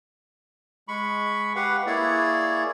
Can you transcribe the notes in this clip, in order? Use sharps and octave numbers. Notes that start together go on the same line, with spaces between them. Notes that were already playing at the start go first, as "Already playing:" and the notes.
G#3 B5 C#6
G4 B4 F5 F#5
A#3 E4 G#4 C#5 D5